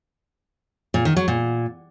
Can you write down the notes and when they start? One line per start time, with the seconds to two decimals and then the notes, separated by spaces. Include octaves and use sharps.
0.94 A#2
1.05 D#3
1.16 F#3
1.28 A#2